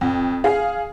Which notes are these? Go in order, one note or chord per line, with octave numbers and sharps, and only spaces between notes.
F2
G#4 F5